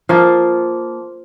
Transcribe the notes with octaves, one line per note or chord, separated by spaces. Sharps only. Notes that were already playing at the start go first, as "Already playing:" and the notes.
F3 A#3 F4